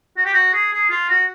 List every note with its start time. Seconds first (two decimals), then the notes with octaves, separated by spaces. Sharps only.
0.17 F#4
0.25 G4
0.34 F#4
0.54 G#4
0.73 G#4
0.90 F4
1.09 F#4